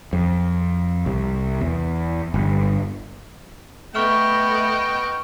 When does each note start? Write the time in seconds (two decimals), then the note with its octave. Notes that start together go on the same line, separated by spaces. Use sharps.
0.13 F2
1.06 C2
1.61 E2
2.34 G1
3.94 A3 B3 D#5 G5 C#6 F6 E7